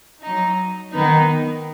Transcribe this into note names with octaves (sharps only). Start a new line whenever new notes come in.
F#3 D#4
D#3 B3 D#4